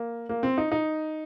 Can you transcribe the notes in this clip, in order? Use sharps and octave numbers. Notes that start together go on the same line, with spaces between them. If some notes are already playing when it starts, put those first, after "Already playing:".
Already playing: A#3
A#3
C4
D#4
D#4